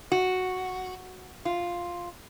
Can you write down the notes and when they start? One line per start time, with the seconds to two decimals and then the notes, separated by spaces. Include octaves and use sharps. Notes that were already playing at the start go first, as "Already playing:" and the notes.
0.12 F#4
1.45 F4